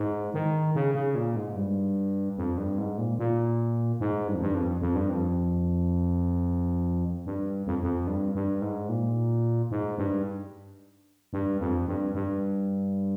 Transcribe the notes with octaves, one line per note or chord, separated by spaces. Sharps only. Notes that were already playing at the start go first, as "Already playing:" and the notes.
Already playing: G#2
D#3
C#3
C#3
A#2
G#2
G2
F2
G2
G#2
A#2
A#2
G#2
G2
F2
G2
F2
F2
G2
F2
G2
F2
F2
G2
G2
G#2
A#2
G#2
G2
G2
F2
G2
G2